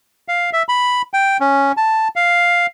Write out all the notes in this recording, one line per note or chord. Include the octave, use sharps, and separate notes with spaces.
F5
E5
B5
G5
C#4
A5
F5